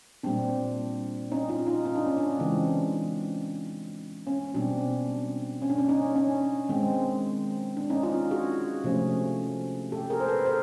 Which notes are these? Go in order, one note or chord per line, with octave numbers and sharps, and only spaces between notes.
A#2 G3 C4 D4
C#4 D#4
D#4 F4
D#4 F4
D#4
D4
C#4
D4
C#3 E3 G#3 C4
C#4
B2 G3 C4 D4
C#4
D4
C#4
C#4 D#4
C#4
D#3 G#3 C4
D4
C#4 D#4
D#4 F4
F#4 G#4
C3 F3 A3 C#4
G4 A4
G#4 A#4
C5
A4 B4
A#4 C5